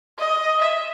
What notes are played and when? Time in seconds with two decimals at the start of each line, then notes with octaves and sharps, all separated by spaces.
0.19 D#5
0.61 E5